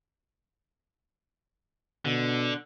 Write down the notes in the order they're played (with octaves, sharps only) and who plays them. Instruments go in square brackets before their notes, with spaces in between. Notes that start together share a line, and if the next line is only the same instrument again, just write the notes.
[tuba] B2 [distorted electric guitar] D3